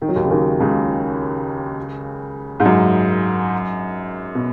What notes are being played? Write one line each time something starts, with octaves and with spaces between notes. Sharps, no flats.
D#3
F#3
D#2 D#3
C#3
D#2 D#3
C#2 C#3
G#2
F#2
B2